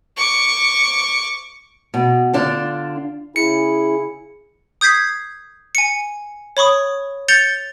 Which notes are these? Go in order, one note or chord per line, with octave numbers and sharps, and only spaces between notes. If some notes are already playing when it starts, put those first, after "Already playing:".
C#6 D6
B2
D3 D4 F4
C#3 E4 G#4 C#7
D#6 G6 G#6 B6 C7
G#5 C#7
C#5 B5 C#6 D#6
G6 A6 C#7 F7 G7